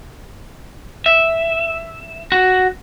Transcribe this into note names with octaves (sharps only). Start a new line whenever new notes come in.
E5
F#4